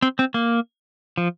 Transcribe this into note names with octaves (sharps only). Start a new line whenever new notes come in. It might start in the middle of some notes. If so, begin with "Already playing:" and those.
C4
C4
A#3
F3